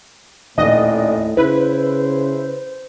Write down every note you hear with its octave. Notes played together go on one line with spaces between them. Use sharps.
D#1 A2 D5 D#5
C#3 E4 B4 C5